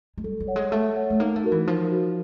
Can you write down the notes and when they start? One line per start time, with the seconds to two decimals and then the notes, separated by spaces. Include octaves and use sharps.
0.18 G#3
0.24 G3 A4
0.40 G3
0.48 C#5 F#5
0.56 G#3
0.71 A3 A4
0.96 C#5 F#5
1.10 A3
1.20 A#3 D#4
1.36 A3
1.44 F#4 A#4
1.52 E3
1.67 F3 D#4
1.91 F#4 A#4